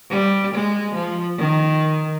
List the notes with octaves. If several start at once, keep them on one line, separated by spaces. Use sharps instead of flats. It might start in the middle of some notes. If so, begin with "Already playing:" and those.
G3
G#3
F3
D#3